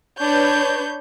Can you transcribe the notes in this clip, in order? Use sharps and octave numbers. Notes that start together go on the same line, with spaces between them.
D4 B4 C#5 G6